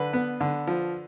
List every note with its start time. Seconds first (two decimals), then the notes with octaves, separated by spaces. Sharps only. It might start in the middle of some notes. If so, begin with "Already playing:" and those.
Already playing: D3 B4
0.13 B3
0.41 D3
0.67 F3